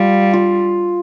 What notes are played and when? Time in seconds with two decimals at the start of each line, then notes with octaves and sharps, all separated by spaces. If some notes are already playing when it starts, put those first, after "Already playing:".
Already playing: G3 F4
0.33 F4